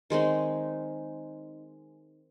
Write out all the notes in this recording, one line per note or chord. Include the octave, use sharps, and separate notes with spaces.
D#3 G#3 C4 D#4